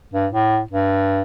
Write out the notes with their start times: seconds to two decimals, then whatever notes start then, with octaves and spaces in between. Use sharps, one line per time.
0.13 G2
0.32 A2
0.71 G2